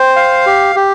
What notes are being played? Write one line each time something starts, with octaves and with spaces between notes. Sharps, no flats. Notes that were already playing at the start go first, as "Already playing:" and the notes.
Already playing: C5 G5
F5
G4
G4